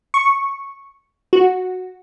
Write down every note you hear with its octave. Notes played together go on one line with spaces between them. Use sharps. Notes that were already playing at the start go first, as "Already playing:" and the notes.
C#6
F#4